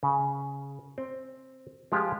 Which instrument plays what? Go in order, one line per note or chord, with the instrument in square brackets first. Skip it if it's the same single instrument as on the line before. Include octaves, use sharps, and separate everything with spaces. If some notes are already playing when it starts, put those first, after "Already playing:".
[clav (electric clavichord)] C#3
C4
F3 G#3 F4 G4